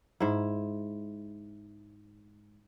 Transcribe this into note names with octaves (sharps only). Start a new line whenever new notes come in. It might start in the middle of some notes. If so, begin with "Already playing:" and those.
G#2 E4